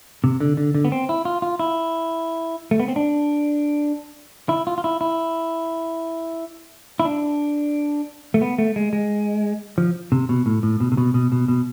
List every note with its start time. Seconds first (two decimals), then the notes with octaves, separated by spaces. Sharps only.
0.24 C3
0.40 D3
0.57 D3
0.75 D3
0.85 B3
0.92 C4
1.09 E4
1.25 F4
1.42 F4
1.59 E4
2.71 A3
2.80 B3
2.88 C4
2.96 D4
4.49 E4
4.67 F4
4.78 F4
4.84 E4
5.01 E4
7.00 E4
7.05 D4
8.34 A3
8.42 B3
8.58 A3
8.76 G#3
8.93 G#3
9.78 F3
10.12 C3
10.29 B2
10.46 A2
10.63 A2
10.81 B2
10.92 C3
10.97 B2
11.14 B2
11.32 B2
11.48 B2